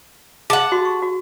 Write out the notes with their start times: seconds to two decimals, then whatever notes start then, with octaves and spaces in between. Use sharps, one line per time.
0.50 G#4 F#5 A5
0.72 F#4 G4 C6
0.85 C#6
1.02 F#4